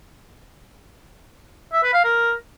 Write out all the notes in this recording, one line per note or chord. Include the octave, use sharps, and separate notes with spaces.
E5
B4
F5
A#4